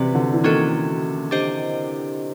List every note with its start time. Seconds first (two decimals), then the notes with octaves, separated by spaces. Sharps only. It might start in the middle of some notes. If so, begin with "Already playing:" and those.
Already playing: C3 C#4 F#4 B4 D5
0.15 D3
0.33 E3
0.44 D#3 A#3 C#4 F#4 A4
1.31 D4 G4 C5 D#5